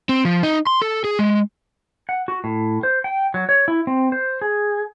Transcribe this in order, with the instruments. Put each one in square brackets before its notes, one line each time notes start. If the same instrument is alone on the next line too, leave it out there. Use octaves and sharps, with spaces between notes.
[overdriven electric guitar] C4
F3
D#4
C6
A4
G#4
G#3
[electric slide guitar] F#5
F#4
A2
C5
G5
F#3
C#5
E4
C4
C5
G#4